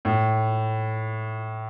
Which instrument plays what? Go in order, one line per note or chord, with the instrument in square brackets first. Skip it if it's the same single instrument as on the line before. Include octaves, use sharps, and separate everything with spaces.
[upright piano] A2